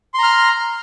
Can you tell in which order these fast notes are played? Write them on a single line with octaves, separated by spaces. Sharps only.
C6 A#5 F6